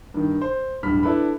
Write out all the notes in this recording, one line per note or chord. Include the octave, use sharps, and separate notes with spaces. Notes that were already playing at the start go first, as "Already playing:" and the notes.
G2 D#3
C5
D1 G2 B5 F6 B6
D4 E4 A4 B4 B5